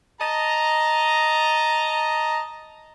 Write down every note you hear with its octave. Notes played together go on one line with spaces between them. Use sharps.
D#5 A5 A#5